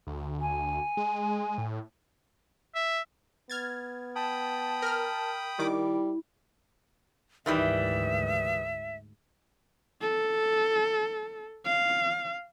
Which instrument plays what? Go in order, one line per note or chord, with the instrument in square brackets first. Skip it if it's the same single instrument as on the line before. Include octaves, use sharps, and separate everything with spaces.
[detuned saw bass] D2
[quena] G#5
[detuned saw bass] G#3
A2
[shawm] E5
[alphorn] B3 [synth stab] F6 G#6 A6
[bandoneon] G5 B5 D#6 [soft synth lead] A5
[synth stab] A#4 F6
[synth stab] D#3 D6 [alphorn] G3 [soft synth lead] E4
[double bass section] D2 G#2 [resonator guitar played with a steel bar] D#3 E3 G3 [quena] E5
[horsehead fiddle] A4
F5